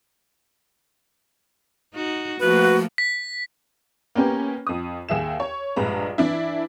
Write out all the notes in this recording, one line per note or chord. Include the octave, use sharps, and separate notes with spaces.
D#4 F#4
F3 A3 A#3 F#4 B4
B6
A#3 B3 C#4 G4
F2 D#6
D#2 G#4 E5 E7
C#5
A#1 G2 G#3 B4 A#5
E3 D4 E4